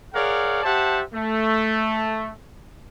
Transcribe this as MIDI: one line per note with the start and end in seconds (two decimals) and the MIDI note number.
0.14 0.60 68
0.14 0.60 70
0.14 0.60 73
0.14 0.60 74
0.14 0.60 77
0.14 0.60 78
0.64 1.02 67
0.64 1.02 72
0.64 1.02 76
0.64 1.02 78
0.64 1.02 81
1.13 2.33 57